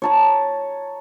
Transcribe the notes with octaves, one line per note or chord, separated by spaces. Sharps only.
C#5 A5 A#5